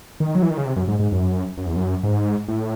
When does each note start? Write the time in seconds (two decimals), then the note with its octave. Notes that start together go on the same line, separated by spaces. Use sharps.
0.20 D#3
0.35 F#3
0.43 E3
0.50 D#3
0.57 C#3
0.65 C3
0.76 F#2
0.88 G#2
0.99 G#2
1.12 F#2
1.58 F#2
1.66 E2
1.76 F#2
2.03 G#2
2.48 A2